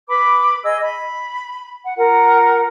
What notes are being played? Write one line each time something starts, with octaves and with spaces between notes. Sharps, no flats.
B4 B5 D6
G#4 D#5 E6
B5
F#5
F4 A#4 F#5